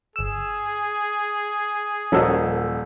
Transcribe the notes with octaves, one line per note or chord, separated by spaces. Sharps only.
G1 G#4 E6
D#1 F3 C#4 F#4 A4 A#4 D#5 E6